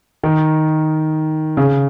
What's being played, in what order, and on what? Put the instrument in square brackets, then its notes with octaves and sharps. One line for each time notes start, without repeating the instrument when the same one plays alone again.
[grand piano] D#3
C#3